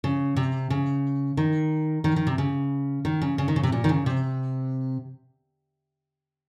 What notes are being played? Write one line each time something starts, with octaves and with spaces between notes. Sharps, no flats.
C#3
C3
C#3
D#3
D#3
D#3
C3
C#3
D#3
C#3
C#3
D#3
C#3
C3
A#2
D#3
C#3
C3